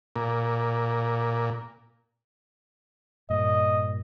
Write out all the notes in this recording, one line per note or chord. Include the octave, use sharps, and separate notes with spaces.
A#2
G2 A#2 D#5